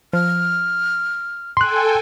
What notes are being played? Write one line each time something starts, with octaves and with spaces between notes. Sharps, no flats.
F3 F6
A4 G5 G#5 C6 F#6